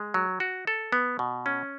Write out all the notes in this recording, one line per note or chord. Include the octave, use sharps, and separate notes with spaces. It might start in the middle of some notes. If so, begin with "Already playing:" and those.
Already playing: G#3
F#3
F#4
A4
B3
B2
C#4